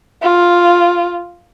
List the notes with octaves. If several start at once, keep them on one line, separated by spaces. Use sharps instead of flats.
F4